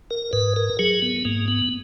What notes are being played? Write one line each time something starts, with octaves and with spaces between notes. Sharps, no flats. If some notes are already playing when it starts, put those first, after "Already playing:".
A#4
G#2 B4
A#4
F#3 G#4
B3
G#2 A#3
B3